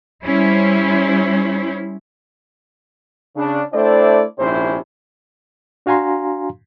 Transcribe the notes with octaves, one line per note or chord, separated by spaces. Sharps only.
G3 C#4 E4 C5
C#3 D4
A3 C4 D4 E4 C5 D5
A#1 G#2 C3 C#4 E4 C5
D4 F#4 F5 G#5 A#5 C6